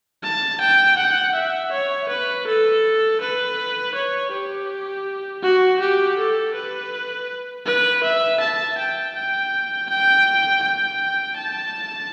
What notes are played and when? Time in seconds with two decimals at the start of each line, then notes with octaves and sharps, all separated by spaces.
0.23 A5
0.60 G5
0.97 F#5
1.35 E5
1.71 C#5
2.09 B4
2.47 A4
3.21 B4
3.94 C#5
4.32 G4
5.43 F#4
5.80 G4
6.18 A4
6.55 B4
7.66 B4
8.03 E5
8.40 A5
8.78 G5
9.15 G5
9.89 G5
10.63 G5
11.37 A5